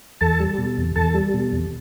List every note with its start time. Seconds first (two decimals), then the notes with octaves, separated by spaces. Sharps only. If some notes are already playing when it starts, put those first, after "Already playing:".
0.21 E2 A4 A5
0.40 G3
0.58 B2
0.77 E2
0.96 E2 A4 A5
1.14 G3
1.34 B2
1.52 E2